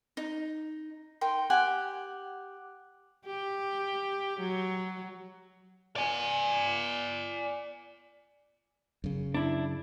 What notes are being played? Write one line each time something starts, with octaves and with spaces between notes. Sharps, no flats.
D#4
D#4 A#4 G5 C6
G4 F#5 G#5
G4
F#3
D5 G#5
F#2 C#3
D4 E4